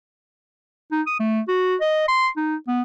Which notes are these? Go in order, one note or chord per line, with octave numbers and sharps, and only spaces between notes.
D#4
D#6
A3
F#4
D#5
C6
D#4
B3